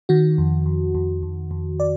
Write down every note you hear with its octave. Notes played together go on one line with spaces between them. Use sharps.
D#3 F#4
F2
F2
F2
F2
F2
D5